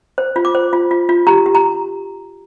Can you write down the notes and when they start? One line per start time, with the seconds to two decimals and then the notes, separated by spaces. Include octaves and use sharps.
0.18 C5
0.36 F4
0.45 D6
0.55 C5
0.73 F4
0.91 F4
1.09 F4
1.27 G4 A#5
1.46 G4
1.55 A#5